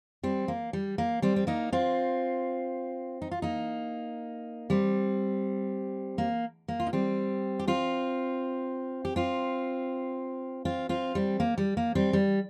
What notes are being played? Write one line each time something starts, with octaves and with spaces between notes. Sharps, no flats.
G3 C4
A#3
G3
A#3
G3 C4
C4
A#3 D#4
C4 F4
D#4
F4
A#3 D#4
G3 C4
A#3
A#3
F4
D#4
G3 C4
G4
C4 F4
G4
C4 F4
C4 F4
C4 F4
G3 C4
A#3
G3
A#3
G3 C4
G3